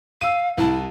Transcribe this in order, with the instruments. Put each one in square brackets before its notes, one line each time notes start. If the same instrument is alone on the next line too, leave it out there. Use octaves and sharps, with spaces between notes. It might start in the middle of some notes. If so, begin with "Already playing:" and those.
[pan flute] F5 [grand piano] E6 D#7
[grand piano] C2 A5 [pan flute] E4